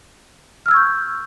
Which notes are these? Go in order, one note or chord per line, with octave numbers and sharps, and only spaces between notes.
C#6 E6 F6 G6 G#6